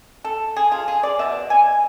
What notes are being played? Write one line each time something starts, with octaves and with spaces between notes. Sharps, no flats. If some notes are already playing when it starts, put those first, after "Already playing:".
A4
G#4
F4
G#4
D5
B2 B3 E5
G#5